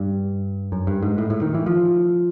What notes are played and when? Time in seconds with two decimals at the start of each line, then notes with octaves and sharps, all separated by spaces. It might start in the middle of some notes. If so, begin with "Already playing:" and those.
Already playing: G2
0.72 F#2
0.87 G2
1.03 G#2
1.18 A2
1.30 A2
1.42 D#3
1.54 E3
1.66 F3